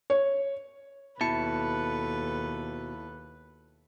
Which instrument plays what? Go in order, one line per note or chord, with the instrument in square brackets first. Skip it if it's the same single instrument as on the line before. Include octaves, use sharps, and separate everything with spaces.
[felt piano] C#5
[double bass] D#2 [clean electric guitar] B2 [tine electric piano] E4 A5 C#7 [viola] A4 B4